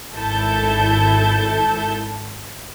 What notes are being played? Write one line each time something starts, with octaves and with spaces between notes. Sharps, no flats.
G#1 E4 A4 A5 G6